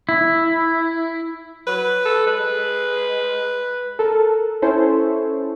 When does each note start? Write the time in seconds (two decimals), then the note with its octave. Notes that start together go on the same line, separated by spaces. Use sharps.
0.09 E4
1.67 F#3 B4
2.05 A4
2.27 G#3 B4
3.99 A4 A#4
4.62 C#4 E4 A4 C5 C#5